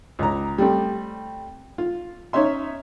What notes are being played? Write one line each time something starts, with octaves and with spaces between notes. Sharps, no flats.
C#2 A#5
G3 A3 C4
F4
C#4 D#4 E5 C6